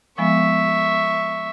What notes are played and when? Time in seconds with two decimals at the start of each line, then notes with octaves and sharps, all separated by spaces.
0.18 F3 G#3 B3 E5 C#6